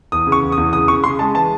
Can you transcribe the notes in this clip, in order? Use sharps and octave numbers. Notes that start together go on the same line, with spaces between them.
E2 D#6
C#3
C#6
E2
D#6
E2
C#3 D#6
C#3 C#6
C#3 C6
G#3 A5
E3 A5